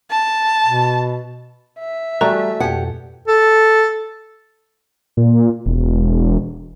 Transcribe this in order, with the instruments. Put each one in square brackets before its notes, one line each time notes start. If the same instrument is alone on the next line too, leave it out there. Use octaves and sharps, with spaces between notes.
[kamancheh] A5
[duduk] B2
[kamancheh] E5
[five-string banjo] E3 A3 A#5 [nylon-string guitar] G3 [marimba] F#4 C#6
[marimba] F2 B2 [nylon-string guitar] G4 F#5
[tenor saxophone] A4
[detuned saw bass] A#2
E1